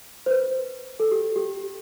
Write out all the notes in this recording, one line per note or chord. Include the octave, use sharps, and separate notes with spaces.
C5
B4
A4
G4
G4